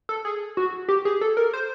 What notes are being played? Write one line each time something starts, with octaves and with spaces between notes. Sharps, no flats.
A4
G#4
F#4
G4
G#4
A4
A#4
C5